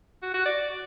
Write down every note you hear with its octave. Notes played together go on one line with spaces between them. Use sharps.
F#4
F#4
D5